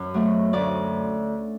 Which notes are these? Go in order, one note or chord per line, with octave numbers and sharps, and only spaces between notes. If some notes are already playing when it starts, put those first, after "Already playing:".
Already playing: F#2
F#3 A3
D2 D5